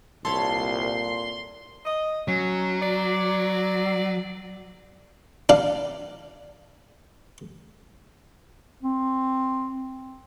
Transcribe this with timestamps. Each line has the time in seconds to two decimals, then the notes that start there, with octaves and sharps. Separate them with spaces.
0.25 C2 A#2 A4 C#5 B5 C6
1.85 D#5
2.28 F#3 C#4
2.82 D5
5.49 D4 F5
8.83 C4